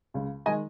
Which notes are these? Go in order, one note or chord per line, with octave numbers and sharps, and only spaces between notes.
C#2 C#3 G#3
D#3 G#3 D#5 G#5